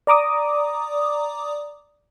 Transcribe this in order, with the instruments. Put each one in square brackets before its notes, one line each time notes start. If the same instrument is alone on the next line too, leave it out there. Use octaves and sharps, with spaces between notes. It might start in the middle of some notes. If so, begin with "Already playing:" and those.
[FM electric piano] D5 A#5 D6 D#6